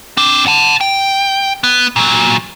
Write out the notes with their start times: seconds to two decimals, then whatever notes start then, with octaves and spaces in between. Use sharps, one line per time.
0.17 C4 D4
0.47 F#5 A5
0.81 G5
1.64 B3
1.96 A#2 F#3